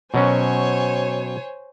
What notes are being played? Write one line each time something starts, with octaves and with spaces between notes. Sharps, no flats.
B2 F#3 C#4 C5 C#5 G#5